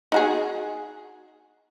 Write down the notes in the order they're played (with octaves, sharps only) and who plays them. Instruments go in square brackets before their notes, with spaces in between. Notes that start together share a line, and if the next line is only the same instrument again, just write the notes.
[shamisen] D#4 F#4 G#4